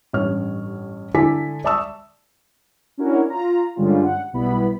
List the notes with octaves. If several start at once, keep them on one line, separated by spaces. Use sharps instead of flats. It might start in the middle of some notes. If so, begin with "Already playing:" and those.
A1 G2 C#5 F6
D3 E4 A4 G#5 D6 B6
D5 E5 A5 C#6 D#6 E6
C#4 D4 E4 F#4 A#4 C#5
F4 A#5
G2 D3 G3 G#3 C#4 F4
F#5
B1 B2 G3 B3 E4 B5